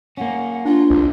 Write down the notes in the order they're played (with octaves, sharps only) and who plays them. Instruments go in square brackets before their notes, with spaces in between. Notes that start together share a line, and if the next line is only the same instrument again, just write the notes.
[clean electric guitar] A#3 C#4 [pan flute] F#5
[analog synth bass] D4 [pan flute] F4
[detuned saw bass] C2